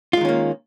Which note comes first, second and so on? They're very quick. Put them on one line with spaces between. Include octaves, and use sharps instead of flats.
F4 G#3 D#3 C#4 A#3